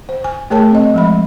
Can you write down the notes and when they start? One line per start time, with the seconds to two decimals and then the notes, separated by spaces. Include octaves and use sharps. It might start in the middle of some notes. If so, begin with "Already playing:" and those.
0.09 C5
0.24 G#5
0.50 A3 G#4 A#4 C#5 A5
0.71 C4 D#5
0.94 F3 G#3 B5